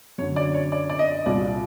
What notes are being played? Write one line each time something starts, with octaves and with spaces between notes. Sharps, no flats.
F#2 D3 C#5
D5
C#5
D5
D5
D#5
C2 A#2 D5